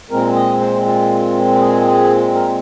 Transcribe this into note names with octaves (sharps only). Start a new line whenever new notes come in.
A#2 G#3 C4 A#4
D#5
C5
F4
G#4
A#4